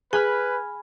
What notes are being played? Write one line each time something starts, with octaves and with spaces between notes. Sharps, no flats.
G#4 B4 G#5 B5 F6